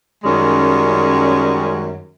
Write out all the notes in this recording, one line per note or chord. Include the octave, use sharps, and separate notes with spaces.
F#2 D#3 G3 G#3 C#4